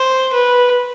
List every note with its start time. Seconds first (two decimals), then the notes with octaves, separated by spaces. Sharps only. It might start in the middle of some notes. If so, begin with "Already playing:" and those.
Already playing: C5
0.33 B4